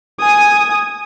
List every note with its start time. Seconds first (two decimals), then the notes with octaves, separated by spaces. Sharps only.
0.20 G#5 D#6